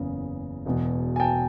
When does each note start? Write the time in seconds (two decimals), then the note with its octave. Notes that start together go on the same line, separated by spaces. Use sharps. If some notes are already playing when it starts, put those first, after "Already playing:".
Already playing: F#1 E2 C#3
0.65 E1 E2 B2
1.16 G#5
1.20 G5 A5